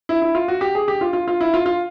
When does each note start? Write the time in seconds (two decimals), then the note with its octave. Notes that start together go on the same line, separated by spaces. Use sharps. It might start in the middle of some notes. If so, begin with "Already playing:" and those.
0.09 E4
0.22 E4
0.35 F4
0.48 F#4
0.61 G4
0.75 G#4
0.88 G4
1.01 F4
1.13 F4
1.28 F4
1.41 E4
1.54 F4
1.66 F4